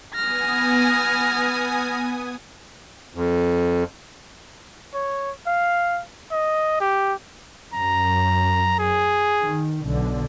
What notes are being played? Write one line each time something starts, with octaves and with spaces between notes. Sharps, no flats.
B3 G#5 D#6 F6 A#6
F2
C#5
F5
D#5
G4
F#2 A#5
G#4
D#3
B1 D3